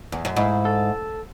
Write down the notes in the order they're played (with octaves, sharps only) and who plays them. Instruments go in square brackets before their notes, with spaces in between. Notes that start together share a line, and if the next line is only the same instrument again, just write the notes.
[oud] E2
F#2
[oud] G#2 [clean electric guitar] E4
[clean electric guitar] A4